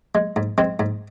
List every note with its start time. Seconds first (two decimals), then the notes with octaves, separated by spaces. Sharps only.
0.15 G#3
0.36 G#2
0.58 G#3 C4
0.80 G#2